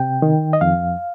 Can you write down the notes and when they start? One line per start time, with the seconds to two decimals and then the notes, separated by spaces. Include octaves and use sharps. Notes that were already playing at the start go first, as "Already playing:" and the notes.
Already playing: C3 G5
0.22 D#3
0.53 D#5
0.61 F2 F5